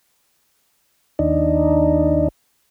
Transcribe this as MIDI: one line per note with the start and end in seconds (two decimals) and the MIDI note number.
1.19 2.28 39
1.19 2.28 62
1.19 2.28 63